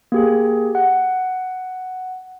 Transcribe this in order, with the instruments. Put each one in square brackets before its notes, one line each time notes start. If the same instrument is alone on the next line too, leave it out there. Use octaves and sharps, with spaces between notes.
[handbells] A#3 G4 G#4
F#5